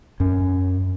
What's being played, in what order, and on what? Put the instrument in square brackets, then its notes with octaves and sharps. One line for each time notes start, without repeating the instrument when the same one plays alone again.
[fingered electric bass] F#2 C#4